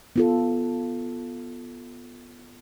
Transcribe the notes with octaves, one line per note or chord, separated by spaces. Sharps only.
B3 F4 A4